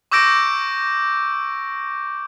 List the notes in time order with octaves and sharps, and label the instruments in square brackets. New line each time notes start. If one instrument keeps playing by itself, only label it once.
[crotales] C#6 D6 E6 G6 A#6 D7